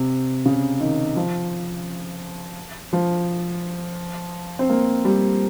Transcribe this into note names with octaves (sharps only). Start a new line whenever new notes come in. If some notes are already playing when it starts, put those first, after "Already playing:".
Already playing: C3
C#3
D#3
F3
F3
C4
A#3
G3